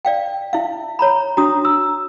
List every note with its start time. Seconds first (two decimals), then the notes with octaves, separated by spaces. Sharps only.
0.05 D5 F5 G5
0.53 E4 E5 F5
0.99 C#5 A#5 B5
1.37 D4 F#4 A#5 D#6
1.65 E6